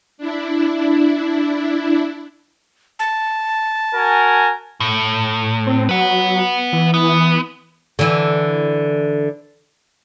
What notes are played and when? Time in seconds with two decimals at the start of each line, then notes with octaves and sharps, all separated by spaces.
0.18 D4 E4
2.99 A5
3.95 F#4 A#4 G#5
4.80 A2
5.67 C4
5.89 F#3 B4 F#5
6.73 E3
6.94 B3
7.99 D3 E3